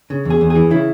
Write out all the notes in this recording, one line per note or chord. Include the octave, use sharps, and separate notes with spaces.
C#3
E2
G#4
E2
G#4
E3
C#3 E4